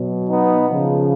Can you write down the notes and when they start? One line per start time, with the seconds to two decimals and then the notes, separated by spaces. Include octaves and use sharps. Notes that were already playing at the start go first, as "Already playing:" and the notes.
Already playing: B2 F#3
0.29 B3 D#4
0.69 C#3 F3